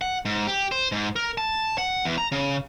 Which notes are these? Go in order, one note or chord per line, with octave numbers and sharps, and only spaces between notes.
F#5
G#2
G4
C5
G#2
A#4
A5
F#5
E2
A#5
C#3